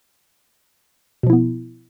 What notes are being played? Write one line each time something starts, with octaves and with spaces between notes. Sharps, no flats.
B2 F3 B3 E4